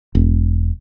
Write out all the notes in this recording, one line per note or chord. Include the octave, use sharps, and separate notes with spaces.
E1